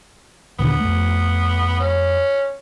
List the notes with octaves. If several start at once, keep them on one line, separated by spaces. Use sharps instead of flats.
D#2 A#2 D3 B3
F2 A3
C#4